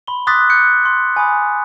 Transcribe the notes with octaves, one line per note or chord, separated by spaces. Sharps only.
B5 C6 G7
C6 D6 D#6 F#6 A6 B6
F#6 G6 C#7
C6
G#5 B5 D#6